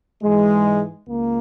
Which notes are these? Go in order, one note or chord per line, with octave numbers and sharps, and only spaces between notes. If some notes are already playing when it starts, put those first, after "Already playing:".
G#2 E3 G#3
C#2 A#3